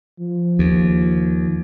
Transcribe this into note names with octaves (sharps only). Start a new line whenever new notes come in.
F3
D#2